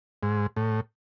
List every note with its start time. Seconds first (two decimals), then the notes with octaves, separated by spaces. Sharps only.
0.23 G#2
0.56 A2